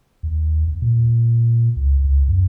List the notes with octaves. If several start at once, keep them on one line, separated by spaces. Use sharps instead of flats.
D#2
D#2
A#2
C#2
C#2
F#2